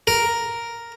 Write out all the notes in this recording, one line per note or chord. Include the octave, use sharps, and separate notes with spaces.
A#4